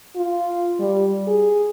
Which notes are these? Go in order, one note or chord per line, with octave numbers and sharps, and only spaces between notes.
F4
G3
G#4